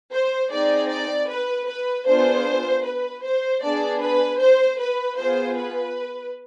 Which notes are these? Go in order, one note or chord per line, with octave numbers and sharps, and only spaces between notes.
C5
C4 D#4 G#4 D5
D5
B4
B4
B3 D4 F4 G#4 C5
B4
C5
B3 D4 G#4 D5
B4
C5
B4
B3 F4 G#4 C5
B4